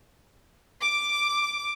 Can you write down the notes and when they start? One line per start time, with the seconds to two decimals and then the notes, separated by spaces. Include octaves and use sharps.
0.84 D6